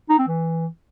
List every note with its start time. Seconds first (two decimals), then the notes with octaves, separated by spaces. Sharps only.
0.10 D#4
0.19 C4
0.28 E3